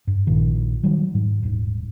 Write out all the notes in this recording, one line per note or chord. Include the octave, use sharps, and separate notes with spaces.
G2
A#1 A#2 D#3
D#3 F#3 G3
G#2
D#1 G#2